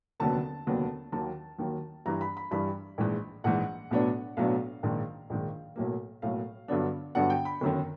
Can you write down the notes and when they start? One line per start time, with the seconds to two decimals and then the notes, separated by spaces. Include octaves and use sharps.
0.20 F1 D#2 D3 F#3 B3 A5
0.66 F1 D#2 D3 F#3 B3
1.12 D#2 D#3 F#3 A#3 A5
1.59 D#2 D#3 F#3 A#3
2.06 G2 E3 G3 A#5
2.21 B5
2.37 B5
2.51 G2 E3 G3 B5
2.98 A#1 G#2 E3 G#3
3.44 A#1 G#2 E3 G#3 F#5
3.91 B1 A2 F#3 B3 D4
4.37 B1 A2 F#3 B3 D4 F5
4.83 A#1 G#2 D#3
5.30 A#1 G#2 D#3
5.76 B1 A2 F#3 A#3
6.22 B1 A2 F#3 A#3 F5
6.68 G2 D3 F#3 B3 D4
7.15 G2 D3 F#3 B3 D4 F#5
7.30 G5
7.45 B5
7.61 G1 F#2 D#3